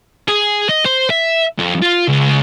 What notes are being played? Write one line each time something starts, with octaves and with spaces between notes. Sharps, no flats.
G#4
D#5
C5
E5
F2
F4
C#2